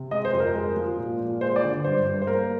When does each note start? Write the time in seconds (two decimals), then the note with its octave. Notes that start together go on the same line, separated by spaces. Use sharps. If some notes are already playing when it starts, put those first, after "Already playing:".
Already playing: C3
0.11 G#3 D#5
0.25 C5
0.33 F2
0.40 A#4
0.54 G#3
0.76 F3
0.97 A#2
1.20 A#2
1.41 G#3 C5
1.56 D5
1.63 D3
1.84 G2 C5
2.06 G2
2.22 C5
2.27 A#3 A#4